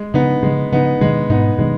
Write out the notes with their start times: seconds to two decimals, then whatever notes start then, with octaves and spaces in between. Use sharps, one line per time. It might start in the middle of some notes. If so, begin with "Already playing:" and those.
Already playing: G#3
0.14 C#3 F3 B3 D#4
0.43 C#3 F3 G#3
0.72 C#3 F3 B3 D#4
1.01 B2 D#3 G#3
1.29 G#2 B2 B3 D#4
1.58 B2 D#3 G#3